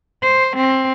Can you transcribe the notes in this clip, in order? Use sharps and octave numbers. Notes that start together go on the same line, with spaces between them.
C5
C4